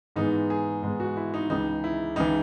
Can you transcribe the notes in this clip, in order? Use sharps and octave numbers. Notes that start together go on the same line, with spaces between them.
G#2 E3 G#3 B3 D#4
G#4
G#2 E3 G#3 B3
F#4
E4
D#4
C#2 C#3 E3 D#4
E4
C#2 C#3 E3 D#4